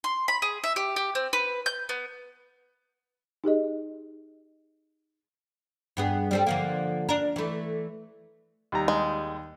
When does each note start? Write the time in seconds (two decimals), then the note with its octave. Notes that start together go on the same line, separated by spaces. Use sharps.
0.04 C6
0.28 B5
0.42 G#4
0.64 E5
0.76 G4
0.96 G4
1.15 C4
1.33 B4
1.66 G6
1.89 B3
3.44 D#4 G4 G#4 D#5
5.97 G2 B3 G#4
6.31 G3 C4 A4
6.46 D3 F3 A#3
7.09 D4 A#4
7.36 E3 A3
8.72 D#2 G3 A#5
8.88 G#3